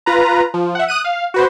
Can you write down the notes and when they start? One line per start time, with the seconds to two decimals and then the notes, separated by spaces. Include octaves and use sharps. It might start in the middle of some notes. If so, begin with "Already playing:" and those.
0.06 F4 B4 A#5
0.54 F3
0.75 E5 F#5
0.88 D#6 F#6 D#7
1.04 F5
1.34 F#4 B4 C5